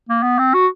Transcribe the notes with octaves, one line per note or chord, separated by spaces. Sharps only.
A#3
B3
C4
F#4